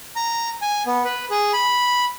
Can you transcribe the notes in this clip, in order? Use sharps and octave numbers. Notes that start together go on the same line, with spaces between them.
A#5
G#5
B3
B4
G#4
B5